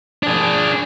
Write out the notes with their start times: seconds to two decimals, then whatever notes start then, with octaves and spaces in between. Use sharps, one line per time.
0.23 D4 G#4